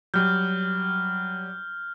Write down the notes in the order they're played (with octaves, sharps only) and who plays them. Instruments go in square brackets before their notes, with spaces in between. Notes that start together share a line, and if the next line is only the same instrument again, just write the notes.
[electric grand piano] F#3 G3 [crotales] F6 G6